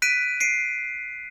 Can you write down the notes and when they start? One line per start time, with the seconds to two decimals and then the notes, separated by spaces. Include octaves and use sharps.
0.02 F#6 B6 D7 D#7
0.40 C7 D7 D#7